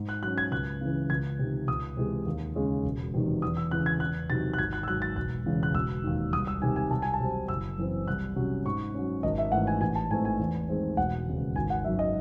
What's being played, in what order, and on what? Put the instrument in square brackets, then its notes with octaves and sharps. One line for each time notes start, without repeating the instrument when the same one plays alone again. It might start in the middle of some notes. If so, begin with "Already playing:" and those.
Already playing: [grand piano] G#2
F#6
F#3 F#6
C#4
G#6
C#2 F#6
C#3 E3
C#2 G#6
C3 D#3
C#2 D#6
C3 E3 G#3
D#2
C#3 G#3 C#4
E1
E2 C3 D#3 F#3
E2 D#6
E6
C#3 E3 F#6
G#6
E2 F#6
C3 D#3 F#3 A6
F#6
G#1 G#6
F#6
E6
G#2 F#3 F#6
A6
E1 F#6
E2 C#3 E3 G#3
F#6
E1 E6
D#2 D#3
C2 D#6
E6
C3 D#3 G#5
G#5
C2 A5
G#5
A5
C3 F#3 C4
F#1 E6
F#2 E3 C4
C2 F#6
C3 F#3 C#4
G#2 C#6
F#3 C#4
G#1 D#5
E5
G#2 E3 A3 F#5
G#5
A1 G#5
A5
G#2 E3 A3 C4 G#5
G#5
E2
D#3 G#3 C4
E1 F#5
D#2 C#3
G#1 G#5
F#5
F#2 D#3 F#3 E5
D#5